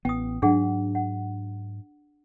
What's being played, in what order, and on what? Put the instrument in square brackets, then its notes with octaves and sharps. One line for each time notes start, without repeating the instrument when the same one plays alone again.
[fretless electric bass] A1 B3 [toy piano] G5 D#6
[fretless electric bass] G#2 F#3 [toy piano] D4 G#4 F#5
[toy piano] F#5